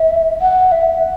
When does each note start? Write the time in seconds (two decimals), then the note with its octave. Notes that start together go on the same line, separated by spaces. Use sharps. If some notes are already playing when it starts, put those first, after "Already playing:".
Already playing: E5
0.41 F#5
0.72 E5